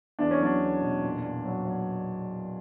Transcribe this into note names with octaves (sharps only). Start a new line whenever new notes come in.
E2 D4
C#4
F#3 D4
E2
B2
A#2
A#2
F#3
F#3